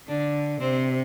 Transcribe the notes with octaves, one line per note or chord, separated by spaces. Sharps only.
D3 D4
C3 C4